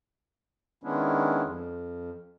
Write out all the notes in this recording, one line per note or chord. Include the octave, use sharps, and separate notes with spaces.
D#3 G#3 B3 C#4 D4 E4
F2